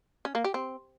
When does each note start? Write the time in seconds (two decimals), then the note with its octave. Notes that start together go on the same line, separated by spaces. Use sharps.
0.25 C#4
0.35 A#3
0.44 G4
0.54 C4